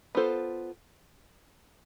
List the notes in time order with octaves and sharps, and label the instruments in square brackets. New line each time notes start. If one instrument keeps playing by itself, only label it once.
[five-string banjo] B3 F4 A4 C5